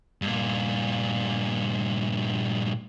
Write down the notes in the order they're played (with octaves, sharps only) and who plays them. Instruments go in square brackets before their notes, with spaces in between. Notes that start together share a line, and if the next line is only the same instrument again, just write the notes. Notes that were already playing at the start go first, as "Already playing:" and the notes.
[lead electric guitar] G2 A#2